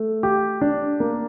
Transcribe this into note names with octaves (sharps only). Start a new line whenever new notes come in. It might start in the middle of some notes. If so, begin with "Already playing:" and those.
Already playing: A3
G4
D4
A#3